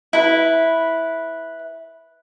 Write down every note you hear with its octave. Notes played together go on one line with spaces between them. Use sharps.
E4 B4